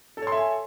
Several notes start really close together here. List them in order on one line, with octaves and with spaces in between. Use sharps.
A4 C#5 C6 E5 G#5